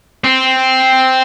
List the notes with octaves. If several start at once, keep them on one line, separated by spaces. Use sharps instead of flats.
C4